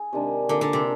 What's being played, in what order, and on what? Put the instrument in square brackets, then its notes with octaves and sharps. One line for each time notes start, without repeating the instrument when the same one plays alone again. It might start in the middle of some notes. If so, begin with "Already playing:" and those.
Already playing: [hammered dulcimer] G#4
C3 D#3 G#3 D4
[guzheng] D3 [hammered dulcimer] F3 A#3 D4
[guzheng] D3
C3